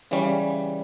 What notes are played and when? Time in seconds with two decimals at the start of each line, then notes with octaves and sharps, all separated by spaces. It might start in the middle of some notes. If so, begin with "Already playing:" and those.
0.11 C#3 E3 G3 C#4